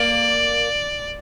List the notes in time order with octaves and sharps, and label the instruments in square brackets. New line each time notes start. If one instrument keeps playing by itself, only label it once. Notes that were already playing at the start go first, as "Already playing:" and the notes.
Already playing: [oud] A#3 A#4 [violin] D5